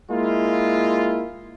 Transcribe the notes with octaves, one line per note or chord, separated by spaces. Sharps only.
G#3 A#3 E4 F4